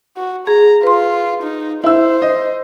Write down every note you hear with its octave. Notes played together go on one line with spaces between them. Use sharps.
F#4
G#4 A#5
F4 B4 C6
D#4
E4 C5 E6
D#5